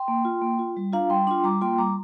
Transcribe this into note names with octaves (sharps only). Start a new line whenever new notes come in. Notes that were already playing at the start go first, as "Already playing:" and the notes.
Already playing: G5 C6
A#3
F4
A#3
F4
G3
D4 F4 F5 A#5
G3 G5 C6
D4 F4 G5 C6
G3 A#5 D6
A#3 F4 G5 C6
G3 A#5 D6